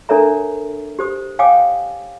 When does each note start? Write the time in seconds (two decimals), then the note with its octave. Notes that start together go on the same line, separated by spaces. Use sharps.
0.09 D4 A4 A#4 C#5 E5 A#5
0.99 G4 C5 D#6
1.39 C#5 F5 G5 G#5 D6 D#6